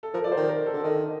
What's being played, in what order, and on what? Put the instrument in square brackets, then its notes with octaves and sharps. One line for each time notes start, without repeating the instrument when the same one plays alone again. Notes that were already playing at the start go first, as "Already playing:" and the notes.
[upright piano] A4
[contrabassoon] F3 [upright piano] A#4
[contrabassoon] F3 [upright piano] D5
[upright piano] C5
[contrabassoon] D#3
[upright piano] A#4
A4
[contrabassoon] D3
[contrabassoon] D#3 [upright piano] D#5